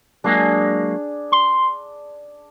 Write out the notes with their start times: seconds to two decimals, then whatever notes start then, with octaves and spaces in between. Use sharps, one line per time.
0.24 F#3 G#3 A#3 D4 G#4 G#5
1.32 C6